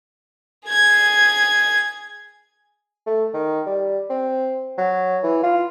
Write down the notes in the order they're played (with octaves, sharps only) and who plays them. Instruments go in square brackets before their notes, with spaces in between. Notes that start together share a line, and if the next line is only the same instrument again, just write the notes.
[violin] G#4 G#6
[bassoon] A3
D#3
G3
C4
F#3
E3
F4